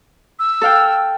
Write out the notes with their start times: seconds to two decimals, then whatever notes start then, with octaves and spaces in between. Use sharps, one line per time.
0.39 E6
0.61 A4 F5 G5